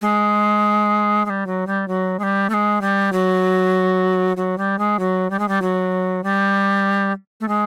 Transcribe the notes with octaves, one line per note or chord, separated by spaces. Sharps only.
G#3
G#3
G3
F#3
G3
F#3
G#3
G3
A3
G#3
G3
F#3
F#3
G3
G#3
F#3
G3
G#3
G3
F#3
G3
A3
G#3